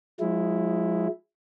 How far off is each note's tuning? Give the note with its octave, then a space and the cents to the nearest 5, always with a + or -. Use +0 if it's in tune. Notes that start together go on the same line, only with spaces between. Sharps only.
F3 +35 G#3 +0 E4 +0